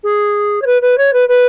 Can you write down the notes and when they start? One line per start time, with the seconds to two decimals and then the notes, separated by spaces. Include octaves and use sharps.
0.03 G#4
0.61 C#5
0.66 B4
0.81 B4
0.97 C#5
1.13 B4
1.28 B4